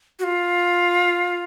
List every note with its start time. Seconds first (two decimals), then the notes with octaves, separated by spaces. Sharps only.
0.19 F#4
0.24 F4